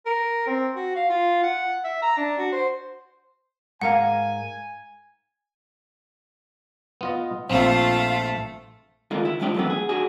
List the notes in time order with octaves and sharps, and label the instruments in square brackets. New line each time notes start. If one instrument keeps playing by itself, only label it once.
[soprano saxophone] A#4
C4
F#4
F5
F4
F#5
E5
A#5
D4
F#4
C5
[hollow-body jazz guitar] G#2 A#4 F5 [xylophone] F#5 [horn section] G#5
[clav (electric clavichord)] B3 F4 D#5
[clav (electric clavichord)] A#1 C4 [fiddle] A3 A4 [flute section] F4 F5
[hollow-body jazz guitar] D3 D#3 G#3 A#3 F4 A4
E4
G#2 D#3 F3 G#3 D4 G4
F#2 C3 E3 A3 B3
G#4
D4 F#4 G#4